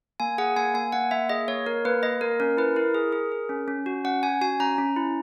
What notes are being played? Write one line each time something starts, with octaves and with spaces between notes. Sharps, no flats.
A#3 G#5
G#4 F#5
A#3 G#5
A#3 G#5
A#3 F#5
A#3 E5
G#4 D#5
A#3 C#5
A#3 A#4
A#3 B4
A#3 D#5
A#3 A#4
C#4 A#4
E4 B4
E4 A#4
G#4
G#4
G#4
C#4
C#4
F#4
C#4 F#5
C#4 G#5
F#4 G#5
C#4 A#5
C#4
E4